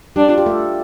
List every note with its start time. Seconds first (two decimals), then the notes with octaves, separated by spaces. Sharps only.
0.16 G3 D4 G4
0.29 F4
0.38 G4
0.46 A3 A4